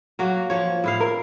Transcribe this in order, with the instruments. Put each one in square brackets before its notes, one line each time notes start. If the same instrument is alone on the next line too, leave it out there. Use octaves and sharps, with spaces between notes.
[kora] F#3 A#3 F#4
F3 C#5
A2 E4 F5
[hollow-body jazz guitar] A#4